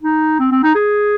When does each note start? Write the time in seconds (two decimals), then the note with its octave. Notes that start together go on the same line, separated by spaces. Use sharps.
0.02 D#4
0.39 C4
0.52 C4
0.63 D#4
0.75 G#4